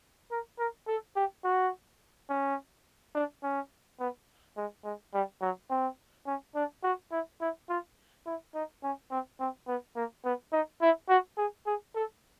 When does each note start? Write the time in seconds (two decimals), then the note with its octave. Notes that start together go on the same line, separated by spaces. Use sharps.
0.31 A#4
0.59 A#4
0.88 A4
1.16 G4
1.44 F#4
2.30 C#4
3.15 D4
3.43 C#4
4.00 B3
4.57 G#3
4.85 G#3
5.14 G3
5.42 F#3
5.70 C4
6.27 C#4
6.55 D4
6.84 F#4
7.12 E4
7.41 E4
7.69 F4
8.26 E4
8.55 D#4
8.83 C#4
9.10 C4
9.40 C4
9.68 B3
9.96 A#3
10.25 B3
10.52 D#4
10.82 E4
11.09 F#4
11.38 G#4
11.66 G#4
11.95 A4